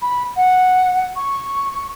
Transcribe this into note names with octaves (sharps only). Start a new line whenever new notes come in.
B5
F#5
C#6